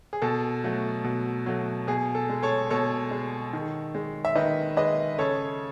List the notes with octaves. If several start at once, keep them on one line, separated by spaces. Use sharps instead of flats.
G#4
B2 A4
F#3 A3
B2
F#3 A3
B2 G#4
A4
G#3
A4 C#5
B2 A4 C#5
G#3
D#3
G#3
E5
D#3 B4 D#5
G#3 B4 D#5
C#3 A4 C#5